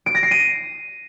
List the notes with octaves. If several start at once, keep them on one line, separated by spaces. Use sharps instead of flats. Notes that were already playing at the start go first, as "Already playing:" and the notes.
D7
A#6
C7
D#7